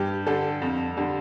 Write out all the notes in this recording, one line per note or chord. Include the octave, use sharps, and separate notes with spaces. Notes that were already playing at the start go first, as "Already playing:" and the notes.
Already playing: G2 G4
D3 G3 A4
F2
D3 G3